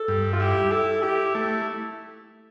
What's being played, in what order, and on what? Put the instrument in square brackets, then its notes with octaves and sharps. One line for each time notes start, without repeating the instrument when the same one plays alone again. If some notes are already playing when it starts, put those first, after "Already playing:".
Already playing: [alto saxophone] A4
[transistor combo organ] G2
[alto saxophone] F4
[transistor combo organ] E4 [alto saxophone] G4
[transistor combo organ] E4 [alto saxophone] A4
[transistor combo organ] E4 [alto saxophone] G4
[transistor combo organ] A3 [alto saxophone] A4